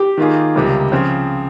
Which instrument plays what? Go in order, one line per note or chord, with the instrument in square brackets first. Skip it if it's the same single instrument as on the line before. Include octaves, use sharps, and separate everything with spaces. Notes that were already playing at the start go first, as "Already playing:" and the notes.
Already playing: [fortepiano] G4
[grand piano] D#3 A#3 F4 G#4
C#2 C3 G3 A#3
C#3 F3 C4